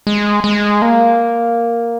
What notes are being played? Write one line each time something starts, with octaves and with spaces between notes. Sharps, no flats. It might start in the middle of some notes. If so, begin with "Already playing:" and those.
G#3
G#3
A#3